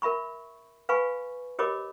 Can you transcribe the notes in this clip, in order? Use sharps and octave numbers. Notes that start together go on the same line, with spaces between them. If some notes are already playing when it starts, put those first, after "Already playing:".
A#4 E5 B5 C#6
B4 F5 G#5 B5 C#6
G4 A#4 C#5 D#5 B5 D6